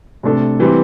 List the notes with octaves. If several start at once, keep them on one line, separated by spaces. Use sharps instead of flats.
C3 A3 D4 A4
E3 G3 C4